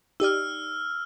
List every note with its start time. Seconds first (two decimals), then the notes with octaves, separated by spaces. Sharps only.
0.20 D#4 G4 D5 E6 F6